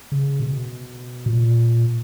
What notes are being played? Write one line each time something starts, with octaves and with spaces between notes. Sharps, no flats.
C#3
B2
A#2